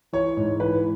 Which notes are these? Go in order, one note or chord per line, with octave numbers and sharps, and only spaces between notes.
E3 C#5
G#2
E3 B4